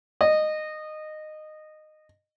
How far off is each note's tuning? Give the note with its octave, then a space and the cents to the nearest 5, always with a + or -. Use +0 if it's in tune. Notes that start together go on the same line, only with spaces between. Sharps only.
D#5 -15